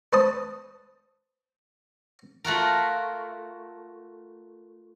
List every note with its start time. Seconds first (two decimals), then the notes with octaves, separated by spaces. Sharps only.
0.13 B4 C5 A5 D#6
2.44 A3 F4 F#4 A#4